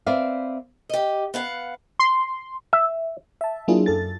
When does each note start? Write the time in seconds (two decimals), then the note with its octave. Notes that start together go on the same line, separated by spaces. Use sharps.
0.06 C4 B4 D5 E5 F5
0.89 G4 D#5
1.34 B3 F5 F#5
1.99 C6
2.73 E5
3.41 E5 A5
3.68 F#3 A#3 D4 E4 F4 G#4
3.86 F#2 A4 A6